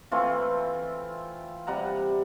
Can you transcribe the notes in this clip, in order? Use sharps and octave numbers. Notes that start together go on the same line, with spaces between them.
E3 A3 C4 F4
C3 G3 F#5 A#5